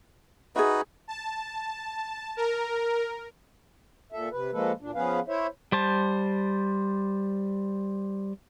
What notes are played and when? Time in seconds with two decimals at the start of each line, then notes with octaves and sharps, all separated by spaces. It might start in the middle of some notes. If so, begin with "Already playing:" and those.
0.56 D#4 F#4 G#4 B4 E5
1.08 A5
2.37 A#4
4.12 A#2 A4 E5
4.32 C3 B4
4.53 F3 G#3 A#3 A4 B4
4.81 D2 A#2 D4
4.95 F3 B3 C#4 G#4 B4 F5
5.28 E4 C5 C#5 E5
5.72 G3 C5 A5